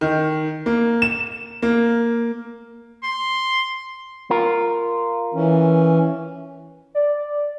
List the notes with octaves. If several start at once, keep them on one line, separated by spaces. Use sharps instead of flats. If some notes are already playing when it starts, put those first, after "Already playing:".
D#3
A#3
E7
A#3
C6
F4 A#4
E3 C#4
D5